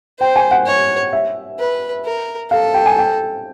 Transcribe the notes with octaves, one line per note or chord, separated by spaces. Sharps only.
C5 G5
G#5
F#5
C#5
E5
B4
A#4
A4 F5
G5
G#5
G5